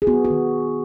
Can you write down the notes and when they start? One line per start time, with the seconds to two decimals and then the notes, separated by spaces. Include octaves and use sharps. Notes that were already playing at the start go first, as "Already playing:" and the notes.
0.02 G#4
0.07 B3 F#4
0.25 F#4
0.30 D#3